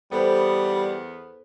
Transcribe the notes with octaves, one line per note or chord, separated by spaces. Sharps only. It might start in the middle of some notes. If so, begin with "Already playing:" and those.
E2 G3 B3 A4 B4 C5